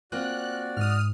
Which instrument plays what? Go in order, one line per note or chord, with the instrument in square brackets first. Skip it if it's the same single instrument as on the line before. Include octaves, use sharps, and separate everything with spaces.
[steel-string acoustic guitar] A#3 C4 F4 [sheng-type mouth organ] F#4 D5 [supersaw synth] F#6
[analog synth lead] G#2 [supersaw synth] D#6 F6